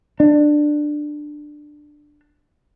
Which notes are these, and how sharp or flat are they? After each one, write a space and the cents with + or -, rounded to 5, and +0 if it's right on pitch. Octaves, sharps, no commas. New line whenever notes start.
D4 +15